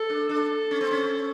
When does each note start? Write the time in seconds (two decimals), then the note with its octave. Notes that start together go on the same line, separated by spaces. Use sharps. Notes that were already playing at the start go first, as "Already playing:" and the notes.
Already playing: A4
0.10 D4
0.29 D4 A4
0.71 C#4
0.81 C4
0.91 C#4